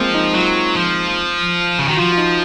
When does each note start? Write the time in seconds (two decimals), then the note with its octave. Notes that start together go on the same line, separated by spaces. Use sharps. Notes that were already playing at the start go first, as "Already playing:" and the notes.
Already playing: F3 G#3 A#3 C4
0.15 D#4
0.35 F#3 F4
0.76 F3
1.79 C#3
1.88 D#3 F#4
1.97 F3 F4
2.13 F4
2.18 D#4